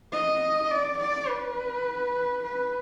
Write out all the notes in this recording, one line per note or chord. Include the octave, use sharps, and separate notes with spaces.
D#5
D5
D5
B4
B4